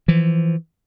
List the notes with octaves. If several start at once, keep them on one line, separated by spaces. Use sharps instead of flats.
E3 F3